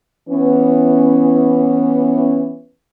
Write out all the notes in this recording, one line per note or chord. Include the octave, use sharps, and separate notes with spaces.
E3 B3 C#4